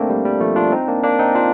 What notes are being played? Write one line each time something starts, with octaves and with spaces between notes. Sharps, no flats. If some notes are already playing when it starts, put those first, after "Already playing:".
Already playing: A3 A#3 C4 D4
G3
G3
F3 A3
D4 F4
C4 D#4
A#3 D4
A#3 D4
C4 D#4
D4 F4